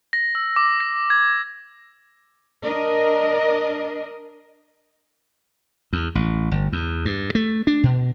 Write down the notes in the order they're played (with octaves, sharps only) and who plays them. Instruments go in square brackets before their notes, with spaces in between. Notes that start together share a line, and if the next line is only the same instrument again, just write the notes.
[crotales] A#6
E6
D6
A#6
G#6
[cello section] D4 A#4 D#5
[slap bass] E2
A1
G1
E2
G2
A3
D4
B2